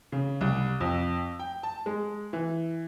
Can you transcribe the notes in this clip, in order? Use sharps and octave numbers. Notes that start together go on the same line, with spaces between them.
C#3
C2
F2
G5
A5
G#3
E3